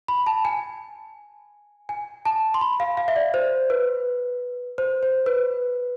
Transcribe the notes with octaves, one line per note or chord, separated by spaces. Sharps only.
B5
A5
G#5
G#5
A5
C6
B5
F5
F5
E5
D5
C5
B4
C5
C5
B4